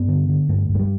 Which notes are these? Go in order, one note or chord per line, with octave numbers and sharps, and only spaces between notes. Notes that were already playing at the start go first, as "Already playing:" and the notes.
Already playing: G2 B3
D3
D3
G2 A3
G2
A3
G3